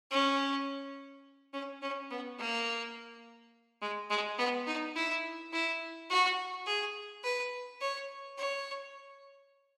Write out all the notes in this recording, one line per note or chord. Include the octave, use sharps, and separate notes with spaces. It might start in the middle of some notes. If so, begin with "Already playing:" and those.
C#4
C#4
C#4
B3
A#3
G#3
G#3
B3
D#4
E4
E4
F#4
G#4
B4
C#5
C#5